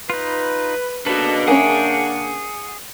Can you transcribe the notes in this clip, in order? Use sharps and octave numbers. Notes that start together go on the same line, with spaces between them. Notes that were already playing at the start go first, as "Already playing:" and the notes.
D#4 F4 B4
C#3 A#3 D4 F#4 A4 B4
C#4 G#4 A#4 F#5 G#5